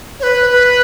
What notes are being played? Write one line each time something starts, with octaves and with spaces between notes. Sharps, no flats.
C#5
B4
B4